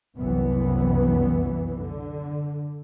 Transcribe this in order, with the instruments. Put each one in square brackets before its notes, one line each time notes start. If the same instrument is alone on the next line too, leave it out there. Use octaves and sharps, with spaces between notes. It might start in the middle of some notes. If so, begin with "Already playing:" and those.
[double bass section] F#1 C2 E3 B3
D3